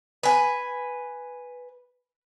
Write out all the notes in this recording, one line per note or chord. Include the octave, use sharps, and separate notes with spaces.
B4 G#5